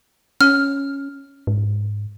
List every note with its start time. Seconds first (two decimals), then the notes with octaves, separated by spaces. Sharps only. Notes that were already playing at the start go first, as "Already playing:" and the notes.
0.41 C#4 F6
1.47 G#2